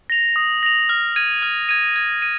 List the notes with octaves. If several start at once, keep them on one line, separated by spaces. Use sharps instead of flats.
A#6 F7
D#6
A#6 F7
F6
G#6 D#7
F6
G#6 D#7
G#6
D#7